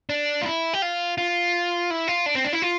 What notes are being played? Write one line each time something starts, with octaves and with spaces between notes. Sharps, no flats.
D4
F4
E4
G4
F4
F4
E4
F4
D4
C4
D4
E4
F4